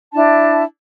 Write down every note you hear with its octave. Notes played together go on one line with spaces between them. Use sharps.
D4 E4 A5